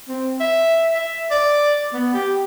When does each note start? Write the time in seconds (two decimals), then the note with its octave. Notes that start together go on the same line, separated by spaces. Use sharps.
0.08 C4
0.40 E5
0.95 E5
1.31 D5
1.93 B3
2.14 G4